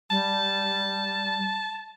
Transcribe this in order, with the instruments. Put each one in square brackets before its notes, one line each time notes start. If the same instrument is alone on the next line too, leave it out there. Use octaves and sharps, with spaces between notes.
[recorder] G3 [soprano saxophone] A5